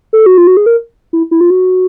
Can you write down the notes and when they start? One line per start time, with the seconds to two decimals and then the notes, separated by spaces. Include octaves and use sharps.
0.13 A4
0.26 F#4
0.38 F4
0.47 F#4
0.57 G#4
0.66 A#4
1.13 E4
1.31 E4
1.41 F4
1.50 F#4